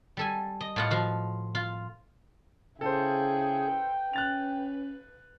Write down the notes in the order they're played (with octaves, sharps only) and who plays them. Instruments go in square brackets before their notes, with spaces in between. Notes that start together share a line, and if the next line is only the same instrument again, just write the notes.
[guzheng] G3 A4 G#5
D#5
A2 F4 F#5
F3 F4 F#4
F4
[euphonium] C#3 [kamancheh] E4 G#4 [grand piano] A4 C5 [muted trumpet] G5
[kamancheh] B4
[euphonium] C#4 [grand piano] F#6 A6 F7